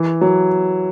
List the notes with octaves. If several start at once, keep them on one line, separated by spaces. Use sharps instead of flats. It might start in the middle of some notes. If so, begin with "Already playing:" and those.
Already playing: E3
F#3